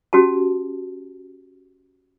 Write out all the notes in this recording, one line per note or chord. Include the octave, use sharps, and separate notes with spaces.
C#4 F#4 G4 A5